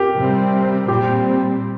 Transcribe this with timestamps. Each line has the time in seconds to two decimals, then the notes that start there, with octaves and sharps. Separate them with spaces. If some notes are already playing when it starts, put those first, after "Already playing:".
Already playing: G4 A#4
0.16 C3 G3 C4
0.88 A#2 G3 C4 G4